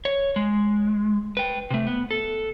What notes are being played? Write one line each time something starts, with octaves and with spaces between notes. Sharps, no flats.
C#5
G#3
B4 G5
C3 A3
B3
A4